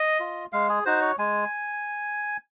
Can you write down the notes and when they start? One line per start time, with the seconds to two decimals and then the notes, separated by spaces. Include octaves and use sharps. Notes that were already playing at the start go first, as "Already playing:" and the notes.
Already playing: D#5
0.20 F4
0.53 G#3 F5
0.69 G#4
0.85 D#4 F#4 C5
1.01 C#5
1.18 G#3 G#5